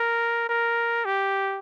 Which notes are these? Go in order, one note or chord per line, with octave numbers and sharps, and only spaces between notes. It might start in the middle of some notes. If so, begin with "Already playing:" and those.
Already playing: A#4
A#4
G4